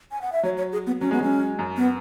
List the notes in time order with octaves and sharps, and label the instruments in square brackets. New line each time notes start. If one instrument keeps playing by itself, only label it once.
[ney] G#5
F#5
E5
[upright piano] F#3 [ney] C#5
[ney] C#5
G#4
B3
[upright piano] F#3 [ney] C#4
[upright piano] G#3 [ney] B3
[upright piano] F#3 [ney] C#4
[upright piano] F#2
[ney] B3